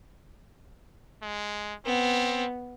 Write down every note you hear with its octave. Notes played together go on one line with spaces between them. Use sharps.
G#3
B3 C4